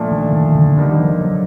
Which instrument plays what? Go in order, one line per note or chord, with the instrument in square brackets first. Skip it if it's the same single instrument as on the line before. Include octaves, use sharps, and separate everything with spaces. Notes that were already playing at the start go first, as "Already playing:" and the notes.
Already playing: [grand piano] A#2 F3 A3 D4
[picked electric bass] D#3
D#3
D3
[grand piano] D3 G3 A#3 D#4 [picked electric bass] D#3
[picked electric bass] F3
F#3